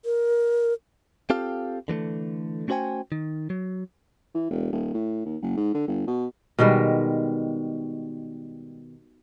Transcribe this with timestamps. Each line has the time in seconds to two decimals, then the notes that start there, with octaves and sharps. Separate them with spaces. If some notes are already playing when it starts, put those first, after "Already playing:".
0.05 A#4
1.30 C4 F4 G4 A4 F5
1.88 D3 E3 G#3 A3
2.68 A3 C#4 F#4 C5 G5 G#5
3.12 D#3
3.50 F#3
4.35 E3
4.51 E1
4.72 D#1
4.94 A2
5.25 D#2
5.42 F#1
5.57 G#2
5.74 D3
5.88 G1
6.07 B2
6.59 B2 D#3 G3 G#3